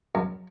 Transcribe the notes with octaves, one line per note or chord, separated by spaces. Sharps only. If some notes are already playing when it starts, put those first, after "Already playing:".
F#2